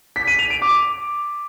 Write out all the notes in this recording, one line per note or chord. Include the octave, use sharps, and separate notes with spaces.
B6
D#7
F7
D7
D6